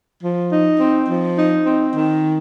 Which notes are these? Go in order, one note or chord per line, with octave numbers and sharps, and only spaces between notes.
F3
D#4
C4
F3
D#4
C4
D#3